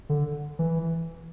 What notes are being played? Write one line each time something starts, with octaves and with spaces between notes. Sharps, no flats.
D3
E3